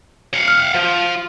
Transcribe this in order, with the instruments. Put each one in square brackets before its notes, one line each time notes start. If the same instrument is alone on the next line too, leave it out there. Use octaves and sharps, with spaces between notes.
[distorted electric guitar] F5 F#5
[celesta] F6
[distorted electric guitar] F3